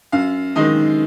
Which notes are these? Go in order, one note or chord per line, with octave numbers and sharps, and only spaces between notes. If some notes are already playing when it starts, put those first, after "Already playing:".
F#2 F5
D#3 G#3 D#4 D#5